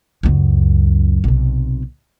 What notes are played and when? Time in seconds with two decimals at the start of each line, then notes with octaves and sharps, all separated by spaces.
0.23 C#2 F#2
1.24 B1 C3